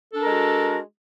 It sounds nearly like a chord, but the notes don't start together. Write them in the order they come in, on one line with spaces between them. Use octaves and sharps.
A4 D4 A#4 G#3 F#4